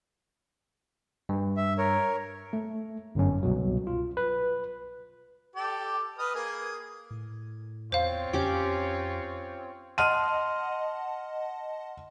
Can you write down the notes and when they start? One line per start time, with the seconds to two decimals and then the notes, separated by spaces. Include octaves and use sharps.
1.29 G2
1.57 E5
1.78 A#4 C#5
2.53 A3
3.15 G1 F#2 C#4
3.43 C2 B2 F#3
3.87 F4
4.17 B4
5.56 G4 A4 D5
6.19 B4 D#5 F6
6.35 A#3 G#4 A#4
7.11 A2
7.92 E2 C4 F4 C5 C#5 F5
8.33 F2 C#4 G4 D6
9.98 D#5 F#5 A5 C6 F6 D#7